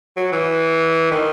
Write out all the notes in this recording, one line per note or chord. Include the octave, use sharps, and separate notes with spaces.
F#3
E3
D#3